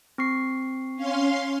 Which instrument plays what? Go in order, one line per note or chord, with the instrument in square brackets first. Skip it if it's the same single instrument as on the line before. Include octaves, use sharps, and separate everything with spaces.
[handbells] C4 C#6 C7
[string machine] C#4 F5 C6